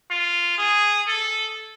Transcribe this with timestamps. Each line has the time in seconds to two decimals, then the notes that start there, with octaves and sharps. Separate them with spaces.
0.11 F4
0.58 G#4
1.08 A4